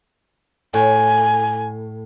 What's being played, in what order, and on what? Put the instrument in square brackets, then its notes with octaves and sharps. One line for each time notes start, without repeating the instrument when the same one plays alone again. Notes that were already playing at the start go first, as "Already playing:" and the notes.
[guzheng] A2 [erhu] G#5